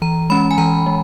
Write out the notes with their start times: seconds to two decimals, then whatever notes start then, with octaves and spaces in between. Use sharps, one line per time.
0.02 E3 A#5
0.30 G#3 C#4 B5
0.51 G#5
0.58 E3 A#5
0.86 G#3